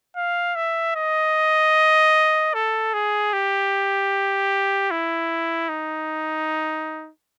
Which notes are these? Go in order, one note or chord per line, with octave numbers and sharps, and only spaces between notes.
F5
E5
D#5
A4
G#4
G4
E4
D#4